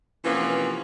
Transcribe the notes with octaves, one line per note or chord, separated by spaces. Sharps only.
C3 E3 F3 A#3 B3 C#4